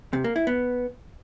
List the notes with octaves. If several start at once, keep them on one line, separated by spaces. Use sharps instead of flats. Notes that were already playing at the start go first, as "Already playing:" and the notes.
C3
A#3
E4
B3